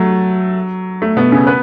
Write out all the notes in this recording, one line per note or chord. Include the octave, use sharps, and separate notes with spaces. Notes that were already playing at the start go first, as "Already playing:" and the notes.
Already playing: F#3 A3
A3
B2 B3
C#3 C#4
B3 B4